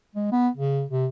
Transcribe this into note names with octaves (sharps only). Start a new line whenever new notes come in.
G#3
B3
C#3
C3